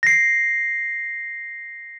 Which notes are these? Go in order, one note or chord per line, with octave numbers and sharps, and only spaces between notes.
A#6 C7